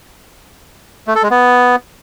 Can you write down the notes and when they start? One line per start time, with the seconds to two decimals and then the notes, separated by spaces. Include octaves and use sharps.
1.07 A3
1.15 A4
1.23 G#3
1.31 B3